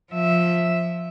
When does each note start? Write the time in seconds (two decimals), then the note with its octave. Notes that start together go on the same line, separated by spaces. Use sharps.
0.12 F3 E5